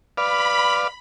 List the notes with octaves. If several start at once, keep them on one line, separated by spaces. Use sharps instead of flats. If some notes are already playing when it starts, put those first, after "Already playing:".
B4 D5 F5 B5